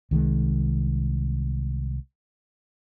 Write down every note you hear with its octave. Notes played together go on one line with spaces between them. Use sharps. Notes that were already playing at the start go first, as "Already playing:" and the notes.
C2 D#3 E3 G#3